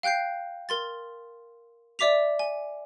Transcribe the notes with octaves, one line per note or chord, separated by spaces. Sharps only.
F5 G5 F#6 G6 C7
A#4 C6 A6
D5 E5 D6 B6 F7
G#5